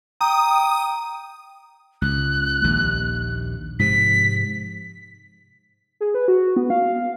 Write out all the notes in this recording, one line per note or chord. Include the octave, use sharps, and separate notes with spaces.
G5 A#5 D#6
C#2 F#6
A#1 D#2
G#2 C3 F3 B6
G#4
B4
F#4
B3
F5
F5